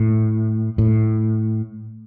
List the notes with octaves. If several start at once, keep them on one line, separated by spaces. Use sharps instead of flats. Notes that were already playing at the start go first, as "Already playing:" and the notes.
Already playing: A2
A2